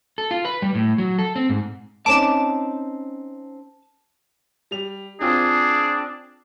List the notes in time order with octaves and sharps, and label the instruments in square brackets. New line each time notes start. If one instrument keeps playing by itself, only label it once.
[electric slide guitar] A4
F4
B4
G3
A2
F#3
A4
C4
G#2
[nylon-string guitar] C4 C#4 D#4 [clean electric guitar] A5 [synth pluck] D6 E7
[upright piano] G3 F7
[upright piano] C4 F4 [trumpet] D4 [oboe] G#4